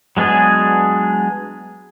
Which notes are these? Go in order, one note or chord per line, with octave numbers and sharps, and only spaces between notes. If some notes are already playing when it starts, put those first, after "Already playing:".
F#3 G#3 B3 D4 G#4